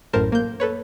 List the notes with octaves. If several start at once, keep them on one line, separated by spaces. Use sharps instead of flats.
A1 F#2 A2 A#4 C5 A5
A#3 G6
A4 B4 C#5